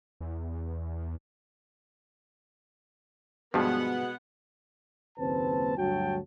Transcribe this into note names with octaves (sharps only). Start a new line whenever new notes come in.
E2
G2 B2 F3 G#3 B3 F#5
F#1 D#2 C4 B4 A5
D2 G2 F#3 F#4 G5 A5